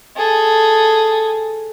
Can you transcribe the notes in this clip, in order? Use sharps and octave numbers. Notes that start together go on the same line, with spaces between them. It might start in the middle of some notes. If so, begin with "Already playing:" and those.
G#4 A4